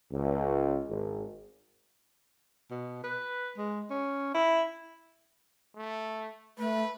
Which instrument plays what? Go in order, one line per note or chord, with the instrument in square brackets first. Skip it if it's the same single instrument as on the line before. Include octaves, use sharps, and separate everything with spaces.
[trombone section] C#2
G#1
[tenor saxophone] B2
B4
G#3
C#4
E4
[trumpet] A3
[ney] A3 [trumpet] B4